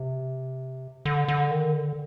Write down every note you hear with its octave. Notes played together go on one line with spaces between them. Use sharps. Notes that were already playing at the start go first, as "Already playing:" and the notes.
Already playing: C3
D3
D3
D#3
D3